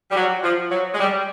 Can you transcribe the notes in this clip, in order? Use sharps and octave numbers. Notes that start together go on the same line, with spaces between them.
G3
F#3
F3
F#3
G#3
G3